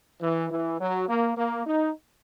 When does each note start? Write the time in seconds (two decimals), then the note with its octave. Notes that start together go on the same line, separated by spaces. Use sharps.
0.21 E3
0.50 E3
0.80 F#3
1.08 A#3
1.37 A#3
1.67 D#4